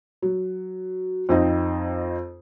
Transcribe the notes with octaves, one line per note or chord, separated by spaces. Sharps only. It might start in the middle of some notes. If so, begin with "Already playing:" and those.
F#3
F2 C4 D#4